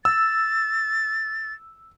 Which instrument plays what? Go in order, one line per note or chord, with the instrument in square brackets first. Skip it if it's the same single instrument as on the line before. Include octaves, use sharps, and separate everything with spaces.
[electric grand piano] E6 [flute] A6